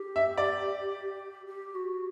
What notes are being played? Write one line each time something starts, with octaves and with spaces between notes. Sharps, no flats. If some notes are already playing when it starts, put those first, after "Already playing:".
Already playing: G4
E5
D5
G4
F#4